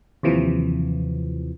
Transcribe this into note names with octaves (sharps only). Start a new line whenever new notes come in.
D#2 C3 E3 F3